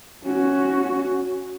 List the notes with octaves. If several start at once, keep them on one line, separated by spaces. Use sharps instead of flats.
C#4 F#4